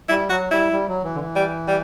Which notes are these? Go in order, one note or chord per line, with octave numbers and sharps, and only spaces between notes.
G3 E4
F#3 F#4
G3 E4
G3
F#3
E3
D3
E3
G3
G3